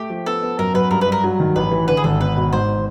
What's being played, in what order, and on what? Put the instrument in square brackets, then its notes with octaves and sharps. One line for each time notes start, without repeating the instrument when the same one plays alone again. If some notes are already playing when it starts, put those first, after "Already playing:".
Already playing: [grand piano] A3 [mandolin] G4
[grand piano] F3
[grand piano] B3 [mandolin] A4
[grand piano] B3
[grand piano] F#2 [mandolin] A#4
[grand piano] F#2 [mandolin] B4
[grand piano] G2 [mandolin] A#4
[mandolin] B4
[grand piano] G2 [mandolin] A#4
[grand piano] F#3
D#3
[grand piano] A1 [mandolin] B4
[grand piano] E3
[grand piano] D3 [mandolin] B4
[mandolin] G#4
[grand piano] G#1 [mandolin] A4
[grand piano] B3 [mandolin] B4
[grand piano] B2
[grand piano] G#2 [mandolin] C5